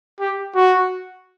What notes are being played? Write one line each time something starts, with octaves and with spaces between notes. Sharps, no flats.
G4
F#4